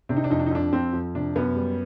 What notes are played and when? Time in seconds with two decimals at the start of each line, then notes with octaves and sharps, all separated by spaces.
0.09 C3 D4
0.17 D#4
0.24 D4
0.30 F2 D#4
0.39 D4
0.46 D#4
0.51 F2 D4
0.72 F2 C4
0.93 F2
1.15 C3 D4
1.36 F#2 B3
1.56 G3